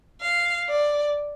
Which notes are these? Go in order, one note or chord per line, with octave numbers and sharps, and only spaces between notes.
F5
D5